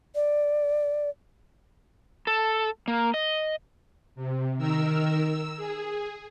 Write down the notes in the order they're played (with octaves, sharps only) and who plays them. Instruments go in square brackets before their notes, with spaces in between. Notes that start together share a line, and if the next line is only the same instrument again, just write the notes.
[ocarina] D5
[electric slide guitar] A4
A#3
D#5
[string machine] C3
D#3 A#4 E6
E6
G#4